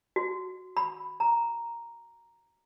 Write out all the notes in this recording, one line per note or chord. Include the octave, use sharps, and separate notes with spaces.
F#4
B5
A#5